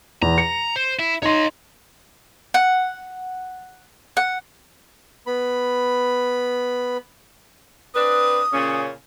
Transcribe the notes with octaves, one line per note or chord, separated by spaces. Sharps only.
E2 A#5
C#7
C5
E4
D#4 C#5 D#5 C6
F#5
F#5
B3 B5
C4 D4 B4 D#6
A#2 C#3 C#4